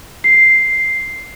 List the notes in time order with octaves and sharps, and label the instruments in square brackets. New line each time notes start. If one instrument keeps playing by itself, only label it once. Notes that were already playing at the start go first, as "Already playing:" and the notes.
[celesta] C7